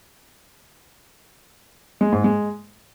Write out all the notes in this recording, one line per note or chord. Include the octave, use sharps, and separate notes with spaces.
G#3
G#2
G#3